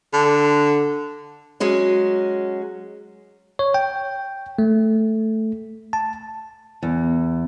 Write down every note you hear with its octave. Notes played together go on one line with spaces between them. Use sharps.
D3
F#3 G#3 C#4
C#5
G5
A3
A5
E2